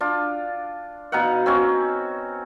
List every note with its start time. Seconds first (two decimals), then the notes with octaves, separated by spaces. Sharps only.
0.01 D4 F4
1.12 B2 D#4 F5 F#5
1.46 C4 C#4 F#4